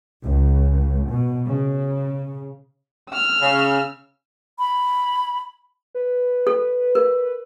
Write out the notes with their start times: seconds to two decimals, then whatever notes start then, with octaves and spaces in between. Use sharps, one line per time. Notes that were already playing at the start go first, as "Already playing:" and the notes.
0.24 C#2
1.09 B2
1.46 C#3
3.10 E6 F6
3.41 C#3
4.59 B5
5.95 B4
6.47 A4
6.95 A#4